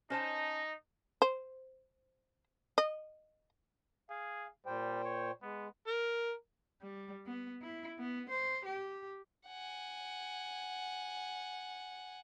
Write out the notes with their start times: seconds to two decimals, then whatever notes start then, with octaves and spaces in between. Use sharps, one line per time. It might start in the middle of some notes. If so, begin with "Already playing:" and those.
0.10 C#4 D#4 C5 A5 A#6
1.22 C5
2.78 D#5
4.10 G#4 F5
4.66 A#2 G3 C5 G5
5.04 C#5
5.42 G#3 B3
5.87 A#4
6.82 G3
7.26 B3
7.62 E4
7.99 B3
8.29 C5
8.65 G4
9.48 F#5 G#5